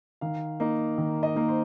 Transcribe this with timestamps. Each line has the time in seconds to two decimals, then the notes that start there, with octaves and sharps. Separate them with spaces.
0.21 D#3 F5
0.60 A#3 D#4
0.98 D#3
1.23 D#5
1.36 A#3 D#4
1.48 C5